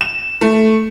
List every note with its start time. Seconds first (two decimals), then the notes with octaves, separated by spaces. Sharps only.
0.01 E7
0.41 A3